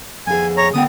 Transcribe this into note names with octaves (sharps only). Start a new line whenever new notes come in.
F2 G#4 G#5
C#5 A#5
D2 B3 G5 D#6